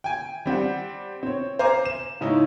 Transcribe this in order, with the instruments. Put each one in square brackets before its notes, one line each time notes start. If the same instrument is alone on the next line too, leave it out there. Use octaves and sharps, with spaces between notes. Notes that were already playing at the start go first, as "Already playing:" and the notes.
[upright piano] G5 G#5
G3 C4 G4 F#5
C4 C#5
C5 F5 G#5 A#5 D6
E7
G#2 C#3 C#4 D#4 E4